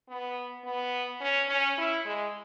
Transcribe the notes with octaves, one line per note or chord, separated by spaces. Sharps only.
B3
B3
C#4
C#4
E4
G#3